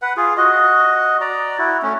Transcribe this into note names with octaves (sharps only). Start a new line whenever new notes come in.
B4 F#5
F4 G#4
F#4 D#5
D5 A#5
E4 F#4
A3 C#4